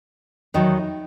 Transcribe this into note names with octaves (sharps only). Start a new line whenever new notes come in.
E2 D#3 F#3 D#4